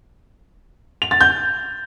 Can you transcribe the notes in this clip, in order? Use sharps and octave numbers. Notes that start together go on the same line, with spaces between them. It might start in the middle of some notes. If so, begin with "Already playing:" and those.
F7
A6
G6